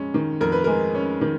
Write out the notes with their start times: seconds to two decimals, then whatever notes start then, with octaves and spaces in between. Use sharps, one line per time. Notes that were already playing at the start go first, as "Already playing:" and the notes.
Already playing: F2 G#3 C#4
0.14 D#3
0.41 F2 A#4
0.52 B4
0.64 G#3 A#4
0.95 C#4
1.21 D#3